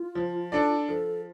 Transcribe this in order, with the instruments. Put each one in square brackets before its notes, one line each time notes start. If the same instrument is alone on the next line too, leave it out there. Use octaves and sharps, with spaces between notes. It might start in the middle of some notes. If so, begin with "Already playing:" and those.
Already playing: [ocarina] F4
[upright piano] F3
D4 A4 D5
[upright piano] F3 [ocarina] A4